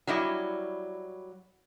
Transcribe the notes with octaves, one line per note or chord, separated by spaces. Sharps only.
F#3 G3 E4 D#5